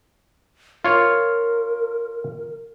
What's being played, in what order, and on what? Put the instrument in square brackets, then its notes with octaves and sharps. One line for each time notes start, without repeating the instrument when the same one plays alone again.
[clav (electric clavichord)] F4 C#5 [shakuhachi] A#4